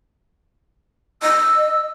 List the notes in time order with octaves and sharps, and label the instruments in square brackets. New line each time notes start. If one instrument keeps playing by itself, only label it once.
[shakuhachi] D#5 [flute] E6